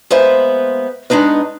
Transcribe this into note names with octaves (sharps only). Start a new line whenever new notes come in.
G#3 A#3 B3 B4 C5 E5
G#3 B3 D4 D#4 B4